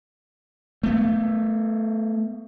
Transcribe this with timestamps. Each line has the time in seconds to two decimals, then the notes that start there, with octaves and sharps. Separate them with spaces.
0.83 A3 B3